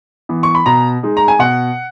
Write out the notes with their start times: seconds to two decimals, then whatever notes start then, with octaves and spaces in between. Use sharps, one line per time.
0.29 E3 B3
0.43 C#6
0.55 B5
0.66 B2 A#5
1.03 G#3 D#4
1.17 A#5
1.28 G#5
1.39 B2 F#5